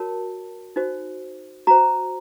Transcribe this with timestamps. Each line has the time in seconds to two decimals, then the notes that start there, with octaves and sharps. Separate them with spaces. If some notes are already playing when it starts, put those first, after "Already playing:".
Already playing: F#4 A#4 C#5 A5
0.76 D#4 F#4 C5
1.67 F#4 C5 A#5